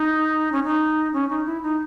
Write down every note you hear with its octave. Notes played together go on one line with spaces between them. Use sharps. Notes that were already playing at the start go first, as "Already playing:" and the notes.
Already playing: D#4
C#4
D#4
C#4
D#4
E4
D#4